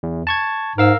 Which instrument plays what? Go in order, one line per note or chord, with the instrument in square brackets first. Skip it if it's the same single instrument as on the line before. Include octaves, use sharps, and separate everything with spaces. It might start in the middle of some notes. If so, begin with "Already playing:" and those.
[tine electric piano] E2
A5 C#6 G#6
[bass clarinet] G#2 [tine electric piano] A#4 F5 E6